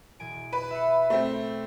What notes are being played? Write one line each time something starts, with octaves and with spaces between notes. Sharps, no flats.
E1 G#5 D7
B4
E5 B5 C#7
A3 C4